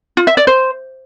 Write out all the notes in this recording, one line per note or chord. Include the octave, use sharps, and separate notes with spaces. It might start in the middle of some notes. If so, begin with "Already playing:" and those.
F4
E5
D5
C5